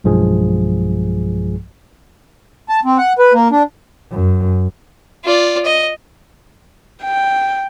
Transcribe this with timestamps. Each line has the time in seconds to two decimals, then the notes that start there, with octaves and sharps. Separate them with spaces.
0.04 B1 G2 F3 G#3 G#4
2.69 A5
2.85 C4
2.98 F#5
3.19 B4
3.34 A#3
3.51 D4
4.11 F#2
5.25 F4 D5
5.65 D#5
7.03 G5